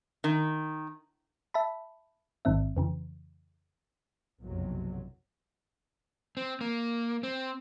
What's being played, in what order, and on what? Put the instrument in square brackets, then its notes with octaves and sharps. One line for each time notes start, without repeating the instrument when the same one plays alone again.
[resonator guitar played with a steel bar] D#3
[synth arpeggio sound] E5 A5 B5
A1 G#2 D#3 C4 E5
F2 C#3 E3
[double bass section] F#1 B1 F2 C3 F#3
[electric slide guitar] C4
A#3
C4